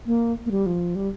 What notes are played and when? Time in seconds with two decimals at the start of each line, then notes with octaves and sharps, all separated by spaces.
0.06 A#3
0.46 A#3
0.51 G3
0.66 F3
0.95 G3